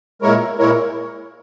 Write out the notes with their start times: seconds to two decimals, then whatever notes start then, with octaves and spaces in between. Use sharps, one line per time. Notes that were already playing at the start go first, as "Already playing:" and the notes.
0.22 A#2 G#3 E4 A#4 C#5
0.58 A#2 G#3 E4 A#4 C#5